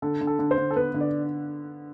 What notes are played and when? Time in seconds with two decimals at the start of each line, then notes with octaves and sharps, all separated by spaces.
0.02 D3 A4
0.21 D3
0.27 A4
0.39 D3
0.51 C5
0.58 D3
0.71 A4
0.76 B3 B4
0.94 D3
1.01 D5